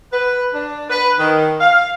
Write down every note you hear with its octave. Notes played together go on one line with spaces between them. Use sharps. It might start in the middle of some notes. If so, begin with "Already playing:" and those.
B4
D4
B4
D#3
F5